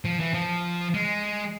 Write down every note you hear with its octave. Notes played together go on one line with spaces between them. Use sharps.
F3
E3
F3
G#3